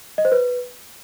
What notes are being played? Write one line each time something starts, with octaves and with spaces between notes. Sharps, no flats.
D#5
C5
B4